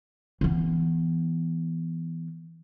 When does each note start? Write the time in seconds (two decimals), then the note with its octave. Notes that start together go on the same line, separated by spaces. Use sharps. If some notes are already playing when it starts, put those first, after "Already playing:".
0.41 E3 B3